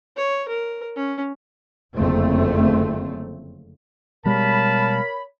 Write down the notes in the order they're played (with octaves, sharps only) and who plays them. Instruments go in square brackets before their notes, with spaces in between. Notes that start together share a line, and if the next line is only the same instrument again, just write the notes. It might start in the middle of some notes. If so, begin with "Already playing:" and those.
[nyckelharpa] C#5
A#4
C#4
[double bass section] F#1 F2 D3 A3 C4
[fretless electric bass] B2 G3 G#3 [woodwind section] A#4 C#5 B5 [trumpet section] F5 A5